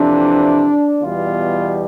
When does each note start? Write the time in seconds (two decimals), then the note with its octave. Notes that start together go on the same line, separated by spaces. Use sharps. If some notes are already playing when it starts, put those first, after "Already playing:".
Already playing: F2 C3 E3 D4
1.01 E2 B2 G3 F4